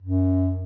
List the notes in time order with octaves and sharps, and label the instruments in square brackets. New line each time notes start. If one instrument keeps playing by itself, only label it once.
[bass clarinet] F#2